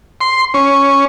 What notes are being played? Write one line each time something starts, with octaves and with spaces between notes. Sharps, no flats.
C6
C#4